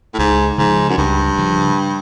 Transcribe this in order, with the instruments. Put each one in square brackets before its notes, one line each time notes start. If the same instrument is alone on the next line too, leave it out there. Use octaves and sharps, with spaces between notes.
[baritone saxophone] A2
[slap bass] C#2 [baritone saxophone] G#2
[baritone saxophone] G#2 [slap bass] C#3 F3
[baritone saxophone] F#2
[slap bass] C#2 [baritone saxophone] G2
[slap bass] C#3 F3